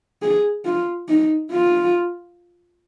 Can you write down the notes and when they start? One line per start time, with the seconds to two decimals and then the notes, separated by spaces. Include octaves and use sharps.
0.22 G#4
0.65 F4
1.09 D#4
1.51 F4